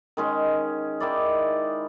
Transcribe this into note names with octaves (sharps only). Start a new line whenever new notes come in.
D#3 G#3 C#4
D#3 E4 D5